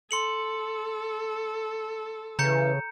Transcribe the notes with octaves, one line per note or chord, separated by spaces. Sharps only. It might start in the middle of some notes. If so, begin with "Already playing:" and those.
A4 C6 C#7 F#7
C#3 E3 A#5 G6 C#7